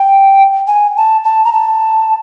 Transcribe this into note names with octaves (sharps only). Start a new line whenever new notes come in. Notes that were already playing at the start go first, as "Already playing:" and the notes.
Already playing: G5
G#5
A5
A5
A#5
A5